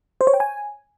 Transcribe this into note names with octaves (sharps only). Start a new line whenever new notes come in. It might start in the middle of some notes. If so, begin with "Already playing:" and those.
C5
C#5
G5
G#5